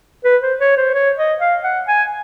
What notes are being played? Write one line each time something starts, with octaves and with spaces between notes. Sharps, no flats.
B4
C5
C#5
C5
C#5
D#5
F5
F#5
G#5